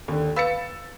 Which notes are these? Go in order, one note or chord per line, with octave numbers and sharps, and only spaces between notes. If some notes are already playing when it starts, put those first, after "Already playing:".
D#2 D3
B4 F5 B5 E6 A6 C#7